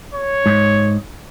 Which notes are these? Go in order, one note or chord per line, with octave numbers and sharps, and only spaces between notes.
C#5
G#2